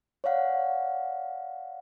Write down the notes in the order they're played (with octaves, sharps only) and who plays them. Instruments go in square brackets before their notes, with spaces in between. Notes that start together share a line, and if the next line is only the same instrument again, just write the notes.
[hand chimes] C#5 D5 F5 F#5